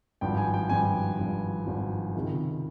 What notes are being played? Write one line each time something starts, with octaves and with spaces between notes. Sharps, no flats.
G#1 G2 F3 G5
G#5
G5
G#1 G2 F3 G#5
G#1 G2 F3
G#1 G2 F3
C#2 C3 D#3